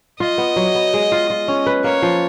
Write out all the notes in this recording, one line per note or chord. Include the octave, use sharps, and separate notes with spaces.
F4 D#5
B3
F#3
B3
G#3
F4
F4
C#4
B4
A#3 C#5
F3